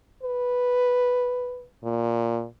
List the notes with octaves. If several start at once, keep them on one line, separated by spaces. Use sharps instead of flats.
B4
A#2